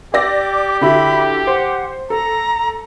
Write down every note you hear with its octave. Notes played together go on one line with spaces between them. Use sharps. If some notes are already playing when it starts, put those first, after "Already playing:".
G4 D5 D6 E6 A#6
D3 E4 F#4 B5
C5 F#5
A4 A#5